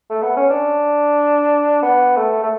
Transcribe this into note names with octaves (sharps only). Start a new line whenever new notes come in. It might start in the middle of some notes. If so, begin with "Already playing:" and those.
A3
B3
C#4
D4
B3
A3
A3